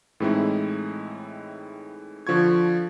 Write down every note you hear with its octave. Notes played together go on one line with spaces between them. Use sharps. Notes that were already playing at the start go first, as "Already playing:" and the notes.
A2 E3 G#3 C4 D#4 E4
D3 F3 F4 C#6 G#6